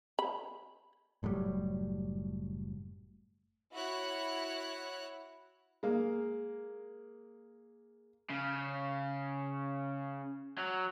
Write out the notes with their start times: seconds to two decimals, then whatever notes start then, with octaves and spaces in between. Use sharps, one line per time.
0.19 B5
1.23 F#1 A2 F#3 G3
3.72 E4 F#4 C#5 F#6
5.83 G#3 A#3
8.30 C#3
10.58 F#3